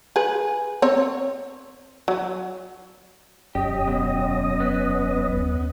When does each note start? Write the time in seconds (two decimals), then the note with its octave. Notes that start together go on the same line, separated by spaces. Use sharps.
0.16 G#4 B4
0.82 C4 C#5
2.08 F#3
3.55 E1 F#2 C#4 G4 D#5
3.87 B2
4.60 B3
5.29 D#2